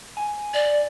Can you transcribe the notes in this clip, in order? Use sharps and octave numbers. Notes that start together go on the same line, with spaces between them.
G#5
D5